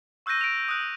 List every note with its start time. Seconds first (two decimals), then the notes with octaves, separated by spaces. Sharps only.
0.26 C#6 E6 F#6 G6 A#6 D#7
0.41 D7 F7
0.69 D#6 F#6